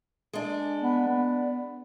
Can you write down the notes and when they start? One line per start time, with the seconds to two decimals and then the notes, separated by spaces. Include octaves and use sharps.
0.33 G#3 D4
0.82 B3
1.08 B3